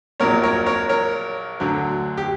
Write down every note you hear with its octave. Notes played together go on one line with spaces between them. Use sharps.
A#1 A#2 F#3 A#4 C#5
A#4 C#5
A#4 C#5
A#4 C#5
D2 D3 F#3
G4